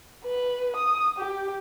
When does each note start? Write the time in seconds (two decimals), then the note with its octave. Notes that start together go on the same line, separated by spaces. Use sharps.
0.25 B4
0.76 D#6
1.19 G4